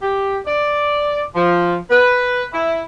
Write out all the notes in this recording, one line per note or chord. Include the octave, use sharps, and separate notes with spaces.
G4
D5
F3
B4
E4